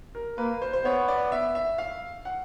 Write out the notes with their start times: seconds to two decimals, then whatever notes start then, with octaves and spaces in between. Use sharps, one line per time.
0.15 A#4
0.38 A#3 B4
0.62 C5
0.73 C5
0.85 B3 C#5
1.08 D5
1.32 E5
1.55 E5
1.78 F5
2.25 F#5